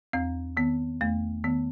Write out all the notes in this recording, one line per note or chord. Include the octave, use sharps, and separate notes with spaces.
E2 C4
D#3 B3
E2 A3
D#3 B3